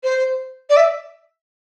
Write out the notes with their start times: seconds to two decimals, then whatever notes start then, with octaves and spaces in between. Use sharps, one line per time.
0.04 C5
0.70 D5
0.77 E5